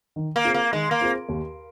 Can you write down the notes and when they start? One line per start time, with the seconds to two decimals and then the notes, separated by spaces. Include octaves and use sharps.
0.16 D#3
0.36 A#3
0.44 C4 F4 G#4
0.54 A#3
0.73 D#3 G#3
0.91 A#3
1.01 C4 F4 G#4
1.29 D#2